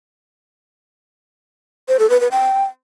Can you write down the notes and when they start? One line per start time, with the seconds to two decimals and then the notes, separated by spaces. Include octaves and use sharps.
1.88 C5
1.99 A4
2.10 B4
2.21 B4
2.31 G5